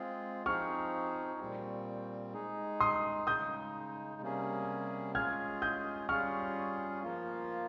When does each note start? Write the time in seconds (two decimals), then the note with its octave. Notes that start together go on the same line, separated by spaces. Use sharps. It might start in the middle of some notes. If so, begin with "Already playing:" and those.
Already playing: G#3 C4 F4 G#4
0.46 F3 C4 D#4 G#4 C#6 F6
1.40 A#2 G3 C4
2.34 G#3 D#4 G#4
2.80 C6 D#6
3.27 C#3 G#3 D#4 D#6 G6
4.21 C3 G3 A#3 C#4 G#4
5.15 G#3 C#4 F4 G#4 F6 G#6
5.62 D#6 G6
6.09 G3 C#4 F4 G#4 C#6 F6
7.03 F3 A#3 F4